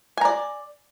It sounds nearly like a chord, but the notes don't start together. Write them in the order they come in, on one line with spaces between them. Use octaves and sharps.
G#5 A#5 D5